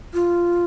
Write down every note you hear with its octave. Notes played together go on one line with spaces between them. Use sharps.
F4